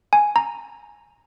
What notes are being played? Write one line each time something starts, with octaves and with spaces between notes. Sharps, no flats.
G#5
A#5